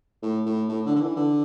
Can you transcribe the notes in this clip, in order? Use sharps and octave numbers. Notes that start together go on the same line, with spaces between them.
A2
A2
A2
D3
D3
E3
D3